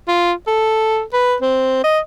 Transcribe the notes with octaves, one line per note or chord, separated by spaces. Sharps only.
F4
A4
B4
C4
D#5